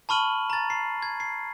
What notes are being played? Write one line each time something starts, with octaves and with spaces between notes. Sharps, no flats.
A5 B5 C#6 F6 D#7 F#7
A#5 A6
C7
G#6
C7